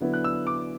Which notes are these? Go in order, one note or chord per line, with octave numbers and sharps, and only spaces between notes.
D3 F#3 B3 E4
F#6
E6
D6